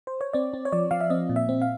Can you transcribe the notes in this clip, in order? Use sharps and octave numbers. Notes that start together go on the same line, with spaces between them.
C5
C#5
C4 D5
C4
C#5
F3 D5
F3 F5
E5
C4 D#5
A#2
E5
C4
F5